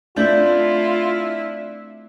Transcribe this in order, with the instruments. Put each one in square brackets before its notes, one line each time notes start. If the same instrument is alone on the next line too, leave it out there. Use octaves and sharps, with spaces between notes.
[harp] A3 C4 G6 [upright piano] D4 [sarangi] E4 [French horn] F4